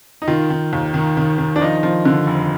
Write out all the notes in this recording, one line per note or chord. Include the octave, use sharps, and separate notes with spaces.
D#4
D#3 F4
D#3
D#2
D#3
D#3
D#3
D4
F3 D#4
F3
D3
F1